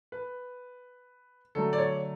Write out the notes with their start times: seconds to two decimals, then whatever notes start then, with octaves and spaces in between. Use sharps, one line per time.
0.12 B4
1.55 D3 F#3 A3 A4
1.73 D5
1.78 C#5